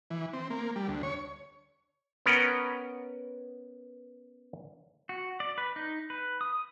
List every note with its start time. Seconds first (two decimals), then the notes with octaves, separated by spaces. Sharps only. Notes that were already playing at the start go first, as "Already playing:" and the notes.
0.11 E3
0.33 C4
0.50 A#3
0.76 G3
0.88 D2
1.03 C#5
2.26 B3 C#4 A#4 B4 F#5 G5
5.09 F#4
5.40 D5
5.58 B4
5.76 D#4
6.10 B4
6.41 D#6